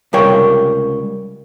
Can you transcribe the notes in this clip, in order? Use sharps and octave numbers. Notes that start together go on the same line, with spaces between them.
C#2 C3 G3 A#4 C#5 G5